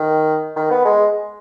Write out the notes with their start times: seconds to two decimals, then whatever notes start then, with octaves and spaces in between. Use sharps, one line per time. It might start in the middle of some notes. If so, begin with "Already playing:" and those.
Already playing: D#3
0.56 D#3
0.71 B3
0.85 G#3